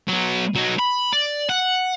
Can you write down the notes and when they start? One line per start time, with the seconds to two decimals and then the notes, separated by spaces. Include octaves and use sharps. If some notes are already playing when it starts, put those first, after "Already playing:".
0.08 F#3 B3
0.55 F#3 D#4
0.79 B5
1.13 D5
1.50 F#5